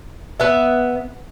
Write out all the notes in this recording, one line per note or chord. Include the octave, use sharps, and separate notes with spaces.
B3 E5